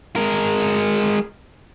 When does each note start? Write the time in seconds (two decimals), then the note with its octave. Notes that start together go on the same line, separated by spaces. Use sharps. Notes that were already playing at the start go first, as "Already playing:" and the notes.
0.16 G#3 A#4